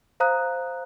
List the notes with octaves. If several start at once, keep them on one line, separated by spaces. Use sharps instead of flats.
C5 F5 A#5 D#6 F#6